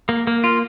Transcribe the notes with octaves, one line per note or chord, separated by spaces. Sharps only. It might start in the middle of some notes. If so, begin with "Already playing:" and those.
A#3
A#3
F4